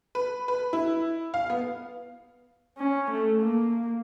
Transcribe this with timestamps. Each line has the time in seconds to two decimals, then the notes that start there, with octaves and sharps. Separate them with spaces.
0.15 B4
0.48 B4
0.73 E4
1.34 F5
1.50 B3
2.78 C#4
3.11 A3
3.42 A#3